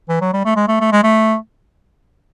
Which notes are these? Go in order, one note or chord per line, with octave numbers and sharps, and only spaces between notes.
E3
F#3
G3
A3
G#3
A3
A3
G#3
A3